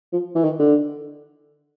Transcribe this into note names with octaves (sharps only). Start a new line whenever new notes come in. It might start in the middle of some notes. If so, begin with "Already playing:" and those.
F3
E3
D#3
D3